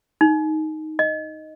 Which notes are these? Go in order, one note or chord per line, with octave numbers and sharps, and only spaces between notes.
D#4
D#5